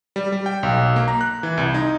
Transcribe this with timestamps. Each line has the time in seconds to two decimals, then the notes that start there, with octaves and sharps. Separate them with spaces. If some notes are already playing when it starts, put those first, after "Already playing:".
0.16 G3
0.32 G3
0.46 G5
0.63 B1
0.96 A#3
1.08 A#5
1.21 F#6
1.43 E3
1.58 C2
1.74 D#4